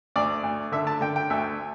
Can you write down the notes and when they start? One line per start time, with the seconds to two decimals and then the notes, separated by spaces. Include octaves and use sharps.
0.16 D2 D5
0.43 D2
0.72 D3 E5
0.87 A5
1.01 D3 G5
1.16 G5
1.30 D2 E5